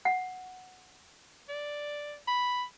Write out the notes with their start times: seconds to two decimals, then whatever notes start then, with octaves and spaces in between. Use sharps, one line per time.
0.05 F#5
1.49 D5
2.27 B5